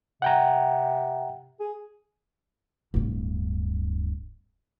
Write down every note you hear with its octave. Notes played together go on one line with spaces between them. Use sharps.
C3 F#5 G5 A#5
G#4
D1 G2